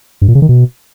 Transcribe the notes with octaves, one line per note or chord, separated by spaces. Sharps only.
G2
A#2
C#3
D#3
B2